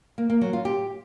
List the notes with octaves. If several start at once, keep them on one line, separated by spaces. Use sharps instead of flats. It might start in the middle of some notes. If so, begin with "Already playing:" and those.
A#3
A#3
F#3
F4
G4